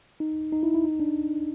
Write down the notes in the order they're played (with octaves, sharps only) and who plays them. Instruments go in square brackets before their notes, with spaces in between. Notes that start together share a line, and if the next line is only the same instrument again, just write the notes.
[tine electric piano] D#4
D#4
E4
E4
D#4
D4